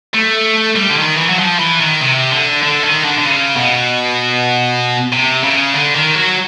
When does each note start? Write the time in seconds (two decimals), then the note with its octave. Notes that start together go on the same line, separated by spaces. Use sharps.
0.14 A3
0.76 G3
0.90 D3
0.98 D#3
1.18 E3
1.29 F#3
1.39 F3
1.59 E3
1.80 D#3
2.02 C3
2.32 D3
2.63 D3
2.84 D#3
3.04 D3
3.19 D3
3.26 C#3
3.56 B2
5.12 C3
5.43 C#3
5.74 D3
5.95 D#3
6.16 F#3